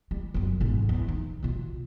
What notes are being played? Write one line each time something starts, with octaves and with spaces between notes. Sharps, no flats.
G3
G1 F#2
B1 G#2
E2
D#4
B2 F4